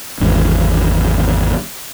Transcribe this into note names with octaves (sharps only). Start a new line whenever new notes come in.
G#1 E2 G#2